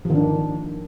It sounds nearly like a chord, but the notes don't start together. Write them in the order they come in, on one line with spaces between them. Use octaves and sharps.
F3 D#3 D4